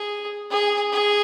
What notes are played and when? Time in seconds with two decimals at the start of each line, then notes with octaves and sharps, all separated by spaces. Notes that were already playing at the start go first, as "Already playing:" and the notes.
Already playing: G#4
0.51 G#4
0.93 G#4